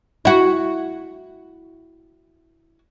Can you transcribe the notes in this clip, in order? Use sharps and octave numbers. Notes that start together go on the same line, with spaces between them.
E4 F#4